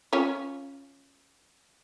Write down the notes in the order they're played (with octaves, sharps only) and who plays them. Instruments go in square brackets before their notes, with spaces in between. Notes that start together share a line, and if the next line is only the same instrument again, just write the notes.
[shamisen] C#4 F4 C#5